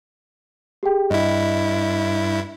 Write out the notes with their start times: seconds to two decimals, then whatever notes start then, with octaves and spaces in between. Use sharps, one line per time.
0.83 G4 G#4 G5
1.10 G2 E4 D#5